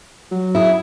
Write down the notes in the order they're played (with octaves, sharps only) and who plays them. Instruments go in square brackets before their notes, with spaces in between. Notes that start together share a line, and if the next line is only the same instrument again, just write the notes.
[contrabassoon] F#3
[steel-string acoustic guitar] E4 G#4